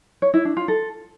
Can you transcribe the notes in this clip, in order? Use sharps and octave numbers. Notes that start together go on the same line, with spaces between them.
C#5
E4
D4
F4
A4